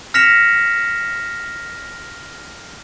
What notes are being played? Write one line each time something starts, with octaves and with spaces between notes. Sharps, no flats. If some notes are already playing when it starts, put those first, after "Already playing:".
F6 A#6 B6 C#7 E7 F7